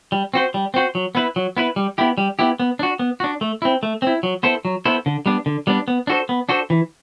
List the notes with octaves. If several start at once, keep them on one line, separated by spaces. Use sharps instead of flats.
G3
C4 F#4 C5
G3
C4 F#4 C5
F#3
B3 E4 B4
F#3
B3 E4 B4
G3
B3 E4 G4
G3
B3 E4 G4
B3
D4 F#4
B3
D4 F#4
A3
C4 E4
A3
C4 E4
F#3
B3 E4 A4 C5
F#3
B3 E4 A4 C5
D3
G3 B3 D4
D3
G3 B3 D4
B3
D4 F#4 A4 C5
B3
D4 F#4 A4 C5
E3